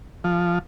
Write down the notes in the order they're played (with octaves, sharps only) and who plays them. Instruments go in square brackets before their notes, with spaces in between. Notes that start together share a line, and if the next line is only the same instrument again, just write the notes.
[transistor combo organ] F3